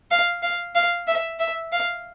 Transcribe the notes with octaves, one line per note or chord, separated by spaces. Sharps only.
F5
F5
F5
E5
E5
F5